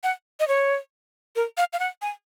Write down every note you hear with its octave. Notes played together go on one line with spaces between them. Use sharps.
F#5
D#5
C#5
A#4
F5
F5
F#5
G#5